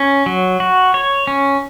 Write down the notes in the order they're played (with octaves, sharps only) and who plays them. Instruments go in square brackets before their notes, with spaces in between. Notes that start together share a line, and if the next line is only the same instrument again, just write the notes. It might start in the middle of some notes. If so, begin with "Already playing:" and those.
Already playing: [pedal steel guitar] C#4
F#3
F#4
C#5
C#4